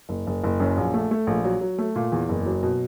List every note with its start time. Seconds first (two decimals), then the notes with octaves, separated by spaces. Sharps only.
0.09 F#1
0.27 F#1
0.43 F#1
0.60 F#2
0.77 A#1
0.94 A3
1.11 A3
1.27 A#1
1.44 F#3
1.61 F#3
1.78 A3
1.96 A#2
2.12 E2
2.29 F#1
2.46 F#3
2.63 B2